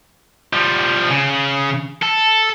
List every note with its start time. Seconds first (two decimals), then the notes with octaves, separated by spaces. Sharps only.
0.53 F3 G3
1.10 C#3
2.02 A4